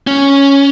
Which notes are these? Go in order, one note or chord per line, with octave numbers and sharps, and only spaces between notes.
C#4